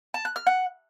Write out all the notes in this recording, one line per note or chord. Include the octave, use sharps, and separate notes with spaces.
A5
F#6
F6
F#5